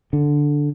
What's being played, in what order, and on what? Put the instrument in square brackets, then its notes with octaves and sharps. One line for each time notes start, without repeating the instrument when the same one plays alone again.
[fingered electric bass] D3